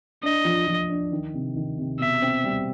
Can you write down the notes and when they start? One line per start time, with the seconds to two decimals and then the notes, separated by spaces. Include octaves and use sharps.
0.23 D4 D#5
0.45 F3
0.67 F3
0.89 D4
1.12 D#3
1.34 C3
1.56 D#3
1.78 C3
1.99 B2 E5
2.22 C4
2.44 G3